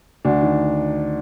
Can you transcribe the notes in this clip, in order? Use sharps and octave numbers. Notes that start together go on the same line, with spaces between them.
D2 D4
D#3